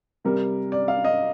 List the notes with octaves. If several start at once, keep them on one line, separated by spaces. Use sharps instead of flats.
C3 G3 A#4
D5
F5
D#5